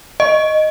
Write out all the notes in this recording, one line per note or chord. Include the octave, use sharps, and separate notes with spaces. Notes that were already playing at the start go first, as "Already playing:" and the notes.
D#5